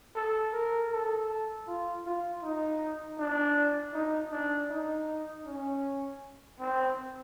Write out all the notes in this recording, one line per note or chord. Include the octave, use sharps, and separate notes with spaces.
A4
A#4
A4
F4
F4
D#4
D4
D#4
D4
D#4
C#4
C4